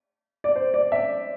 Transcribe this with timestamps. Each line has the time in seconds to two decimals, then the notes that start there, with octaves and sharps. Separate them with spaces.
0.44 D5
0.56 C5
0.74 D5
0.92 E5